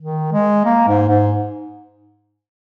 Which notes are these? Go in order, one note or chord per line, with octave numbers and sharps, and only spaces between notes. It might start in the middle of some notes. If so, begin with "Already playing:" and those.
D#3
G#3
A#3
G#2
G#2